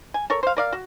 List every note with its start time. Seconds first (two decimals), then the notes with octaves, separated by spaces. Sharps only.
0.14 G#5
0.30 A4 A#4 C#5
0.43 C5 F5
0.57 A#4 D5 F5
0.72 F#4